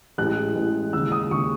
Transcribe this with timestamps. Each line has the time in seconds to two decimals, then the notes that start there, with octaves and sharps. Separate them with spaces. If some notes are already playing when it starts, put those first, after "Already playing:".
0.18 A1 A2 G#3 F#6
0.55 A1 A2 G#3
0.93 D#2 C#3 G#3 E6
1.12 D#6
1.30 D#2 C#3 G#3 C#6